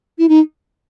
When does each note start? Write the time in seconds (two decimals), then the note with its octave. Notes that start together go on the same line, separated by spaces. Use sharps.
0.19 E4
0.29 D#4